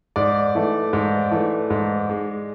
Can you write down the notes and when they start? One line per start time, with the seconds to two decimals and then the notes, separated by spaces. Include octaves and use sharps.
0.16 G#2 D5
0.55 E3 A3
0.93 G#2
1.31 E3 A3
1.70 G#2
2.09 G#3